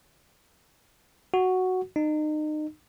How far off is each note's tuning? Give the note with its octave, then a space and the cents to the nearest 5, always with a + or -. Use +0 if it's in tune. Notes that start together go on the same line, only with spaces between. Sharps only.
F#4 +0
D#4 -30